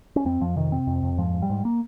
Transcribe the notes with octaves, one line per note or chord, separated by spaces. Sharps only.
C#4
F2 C4
F2 F3
C3 D#3
C3 C4
F2
F2
G#2 F3
G#2
G3
G#2
A#3